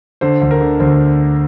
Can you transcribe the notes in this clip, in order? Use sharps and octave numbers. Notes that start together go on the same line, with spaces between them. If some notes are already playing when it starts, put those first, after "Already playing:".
D3 C5
D2
A#4
D3
D2 C5